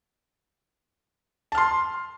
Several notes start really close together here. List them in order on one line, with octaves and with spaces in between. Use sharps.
A5 F6 C6